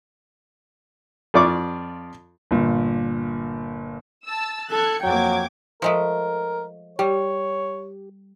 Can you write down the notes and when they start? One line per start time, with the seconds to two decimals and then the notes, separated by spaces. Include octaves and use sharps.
1.34 F2 F4 D5 C#6 D6
2.51 G1 A#2
4.25 A5 E6
4.70 A4 F#6 G#6 C#7
5.03 F2 F#3 A#3 G5 D6 G#6
5.82 F3 G#3 A3 A#4
6.99 G3 G4 C#5